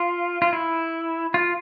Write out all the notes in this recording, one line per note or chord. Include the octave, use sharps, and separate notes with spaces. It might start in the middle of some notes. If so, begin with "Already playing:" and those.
Already playing: F4
F4
E4
F4